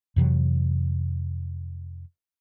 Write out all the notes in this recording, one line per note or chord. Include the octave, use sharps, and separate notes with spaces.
F2 C3 E3 F#3